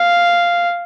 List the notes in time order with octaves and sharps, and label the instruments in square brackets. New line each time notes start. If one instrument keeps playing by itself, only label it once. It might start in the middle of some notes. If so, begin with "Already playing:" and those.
Already playing: [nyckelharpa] F5